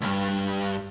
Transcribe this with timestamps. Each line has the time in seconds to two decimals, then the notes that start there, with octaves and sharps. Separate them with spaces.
0.01 C#2 G2